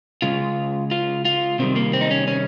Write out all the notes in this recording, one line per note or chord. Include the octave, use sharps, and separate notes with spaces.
C#3 G#3 F4
F4
F4
C3 D#3 G3 C4
A#3
C4
D#4
C#4
C#4